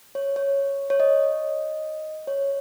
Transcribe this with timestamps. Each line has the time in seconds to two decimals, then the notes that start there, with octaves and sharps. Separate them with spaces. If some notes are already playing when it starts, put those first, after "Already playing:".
0.15 C#5
0.36 C#5
0.90 C#5
1.00 D#5
2.27 C#5